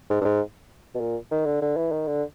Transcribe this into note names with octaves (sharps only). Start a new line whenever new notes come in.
G#2
G2
G#2
B2
A#2
D#3
D3
D3
E3
D#3
D3